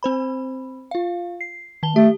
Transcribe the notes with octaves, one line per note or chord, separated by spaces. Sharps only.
C4 C5 B5
F4 F5
C7
D#3 A5 G7
A3 G4